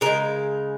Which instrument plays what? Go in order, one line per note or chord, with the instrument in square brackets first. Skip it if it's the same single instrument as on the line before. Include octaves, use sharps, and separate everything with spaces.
[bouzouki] C#3 G#3 A#4